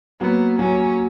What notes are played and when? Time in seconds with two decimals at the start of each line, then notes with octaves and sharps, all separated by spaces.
0.21 F#3 A#3 B3
0.59 F#3 A#3 C#4